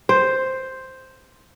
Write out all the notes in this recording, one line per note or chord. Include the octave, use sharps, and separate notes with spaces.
C5